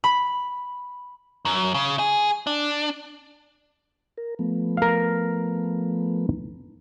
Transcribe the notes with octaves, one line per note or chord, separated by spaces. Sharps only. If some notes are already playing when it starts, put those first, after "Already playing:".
B5
F#2
C#3
G#4
D4
A#4
F3 A3 B3
A#4 F5